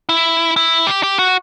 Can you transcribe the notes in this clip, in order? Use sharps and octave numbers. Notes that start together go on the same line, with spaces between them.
E4
E4
G4
G4
F#4